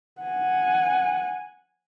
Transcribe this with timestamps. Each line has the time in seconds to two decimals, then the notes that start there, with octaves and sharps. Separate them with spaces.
0.22 F#5 G#5